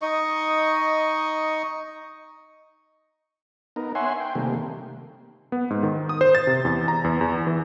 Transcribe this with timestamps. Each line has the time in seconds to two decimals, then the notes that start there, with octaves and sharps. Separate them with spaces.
0.02 D#4 D#5 C#6
3.76 B3 D#4 A#4
3.95 C#5 E5 F#5 G#5 C6
4.20 G5
4.35 C3 D#3 G3 A3 A#3
5.52 B3
5.70 G#2
5.83 D#3
6.09 D#6
6.21 C5
6.35 A6
6.47 C3
6.65 E2
6.88 A#5
7.04 E2
7.21 E2
7.47 E3